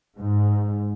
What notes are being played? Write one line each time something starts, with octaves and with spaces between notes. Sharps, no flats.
G#2